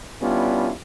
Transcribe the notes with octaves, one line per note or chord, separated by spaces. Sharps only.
G3 B3 C#4 D4 E4 F4